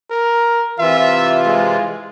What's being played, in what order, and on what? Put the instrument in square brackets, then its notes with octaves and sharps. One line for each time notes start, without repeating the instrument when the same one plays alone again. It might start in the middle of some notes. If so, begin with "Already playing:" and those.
[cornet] A#4
[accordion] C3 E3 F4 [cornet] E5
[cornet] G#3